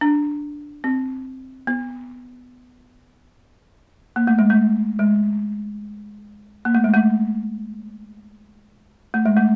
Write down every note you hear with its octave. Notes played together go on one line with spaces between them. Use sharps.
D4
C4
B3
A#3
A3
G#3
A3
G#3
A#3
A3
G#3
A3
A3
G#3
A3